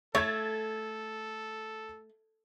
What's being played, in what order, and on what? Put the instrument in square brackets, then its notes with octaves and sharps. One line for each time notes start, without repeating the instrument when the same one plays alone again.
[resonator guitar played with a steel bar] A3 [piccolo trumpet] A4 [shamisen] C#5 [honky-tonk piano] G#6 A6